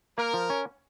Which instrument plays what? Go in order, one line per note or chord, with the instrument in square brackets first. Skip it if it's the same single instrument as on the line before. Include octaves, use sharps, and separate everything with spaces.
[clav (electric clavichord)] A#3 [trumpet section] A#4
[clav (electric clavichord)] F3
C#4